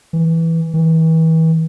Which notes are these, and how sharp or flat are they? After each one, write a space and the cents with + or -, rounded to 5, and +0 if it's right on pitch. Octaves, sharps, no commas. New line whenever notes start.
E3 -5
E3 -35